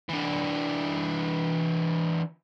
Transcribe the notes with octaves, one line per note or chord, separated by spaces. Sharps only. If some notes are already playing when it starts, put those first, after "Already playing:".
E3 D4